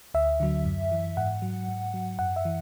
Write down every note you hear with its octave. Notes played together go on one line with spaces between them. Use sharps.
D2 E5
D3 F#3
F#2
E3
G#2 F#5
F#3
G#2
F#3
F#2 F#5
E5
E3